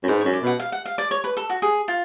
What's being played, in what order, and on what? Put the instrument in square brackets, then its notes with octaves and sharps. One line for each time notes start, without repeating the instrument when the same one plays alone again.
[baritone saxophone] F#2
[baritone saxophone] G#2 [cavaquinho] B4
[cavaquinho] C#5
[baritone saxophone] F#2
[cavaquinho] D5
[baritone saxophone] B2 [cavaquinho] F#5
[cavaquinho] F5
F#5
F5
D5
C#5
B4
A4
F#4
G#4
F4